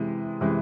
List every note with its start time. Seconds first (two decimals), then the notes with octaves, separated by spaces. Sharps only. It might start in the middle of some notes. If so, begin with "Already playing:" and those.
Already playing: C3 E3 G#3
0.41 C3 E3 G#3